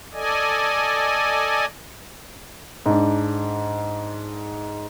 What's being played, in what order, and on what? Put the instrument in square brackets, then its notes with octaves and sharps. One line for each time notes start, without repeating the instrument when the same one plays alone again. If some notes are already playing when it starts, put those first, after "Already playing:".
[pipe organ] A4 D5 D#5 G#5
[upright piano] G#2 D4